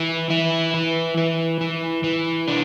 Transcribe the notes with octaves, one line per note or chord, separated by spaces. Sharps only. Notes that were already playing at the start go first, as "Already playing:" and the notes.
Already playing: E3
E3 E4
E3
E3
E3
E3
D4